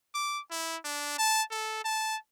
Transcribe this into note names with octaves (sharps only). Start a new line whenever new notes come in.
D6
E4
D4
A5
A4
A5